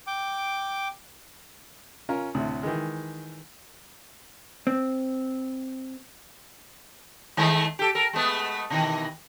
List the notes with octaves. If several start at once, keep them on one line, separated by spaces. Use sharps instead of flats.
G5 D6
C#4 F4 A#4
D2 A2 C3
D#3 E3 G#3
C4
D#3 G#3 A3
G4 A4
A4 A#4
G#3 A3 B3
B2 D#3 E3